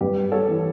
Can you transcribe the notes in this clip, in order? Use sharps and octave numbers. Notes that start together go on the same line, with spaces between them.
G2 G4 B4
A4 C#5
E3